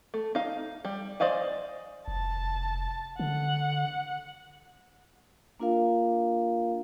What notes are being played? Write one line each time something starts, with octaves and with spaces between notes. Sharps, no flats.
A3
D#4 F5
G3
C5 D5 D#5 F5 G#5
F1 A5
D3 F#5
A#3 D4 F4 A#4 F5